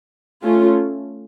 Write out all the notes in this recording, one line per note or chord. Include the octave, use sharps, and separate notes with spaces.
A3 C#4 F4